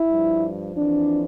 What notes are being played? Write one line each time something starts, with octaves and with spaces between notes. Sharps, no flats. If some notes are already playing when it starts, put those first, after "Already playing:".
Already playing: E4
G2 F3
F2 E3 D4